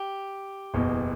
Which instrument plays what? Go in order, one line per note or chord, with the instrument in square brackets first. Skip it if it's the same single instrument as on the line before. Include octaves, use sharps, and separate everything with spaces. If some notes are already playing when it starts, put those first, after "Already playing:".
Already playing: [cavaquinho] G4
[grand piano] F#1 E2 B2